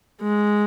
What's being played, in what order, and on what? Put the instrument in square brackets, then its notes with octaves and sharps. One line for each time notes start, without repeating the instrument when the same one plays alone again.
[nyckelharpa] G#3